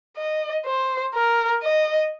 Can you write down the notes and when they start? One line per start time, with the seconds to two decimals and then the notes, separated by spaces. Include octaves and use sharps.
0.17 D#5
0.66 C5
1.15 A#4
1.63 D#5